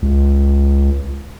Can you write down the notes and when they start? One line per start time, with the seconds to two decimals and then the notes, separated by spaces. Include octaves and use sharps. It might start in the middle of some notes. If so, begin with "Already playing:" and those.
0.02 C#2